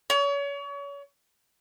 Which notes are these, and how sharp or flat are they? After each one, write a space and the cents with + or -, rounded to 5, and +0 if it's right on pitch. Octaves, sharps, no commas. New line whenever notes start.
C#5 +35